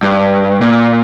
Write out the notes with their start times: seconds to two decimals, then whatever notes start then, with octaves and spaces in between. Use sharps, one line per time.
0.03 G2
0.61 A#2